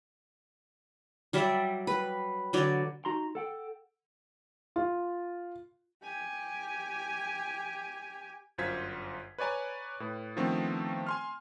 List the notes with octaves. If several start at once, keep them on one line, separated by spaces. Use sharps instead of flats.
F#3 G3 D5 E5
B4
D3 F#3 D5
D#4 F#4 A#5 C6
A4 F#5 G5
F4
G4 G#5
G1 F#2 F4 C5 G#6 B6
B4 C#5 D5 G#5 A#5
A2 B4
D#3 F3 A3 B3 C4 D4
G#5 C6 F6